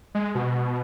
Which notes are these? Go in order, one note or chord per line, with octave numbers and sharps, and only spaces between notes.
G#3
B2